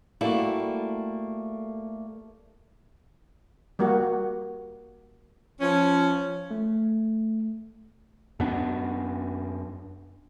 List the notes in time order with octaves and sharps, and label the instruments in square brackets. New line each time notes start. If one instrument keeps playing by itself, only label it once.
[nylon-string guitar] G3 A3 A#3 E4 F#4
[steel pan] G3 A#3 F#4
[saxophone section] F3 C#4
[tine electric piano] A3
[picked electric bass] F#2 B3 D4